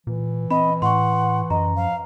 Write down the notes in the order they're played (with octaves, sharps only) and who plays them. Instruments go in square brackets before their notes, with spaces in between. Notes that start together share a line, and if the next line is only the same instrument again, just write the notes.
[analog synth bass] A#2 [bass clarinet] E3
[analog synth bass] C4 [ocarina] D#5 [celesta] B5
[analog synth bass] A2 [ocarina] F#5 [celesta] C6 C#6
[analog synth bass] F#2 [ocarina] D#5 [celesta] A#5
[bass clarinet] F3 [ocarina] F5